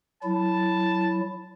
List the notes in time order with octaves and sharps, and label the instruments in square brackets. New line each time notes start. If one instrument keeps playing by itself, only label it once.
[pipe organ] F#3 E4 [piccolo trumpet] A5